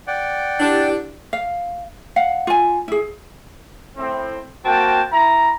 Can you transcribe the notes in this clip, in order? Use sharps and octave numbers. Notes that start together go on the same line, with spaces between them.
D5 F#5 G5
D4 E4 G4
F5
F5 F#5
F4 G#5
E4 G#4
A2 C4
A#3 C4 F#4 G5 A5
E4 A#5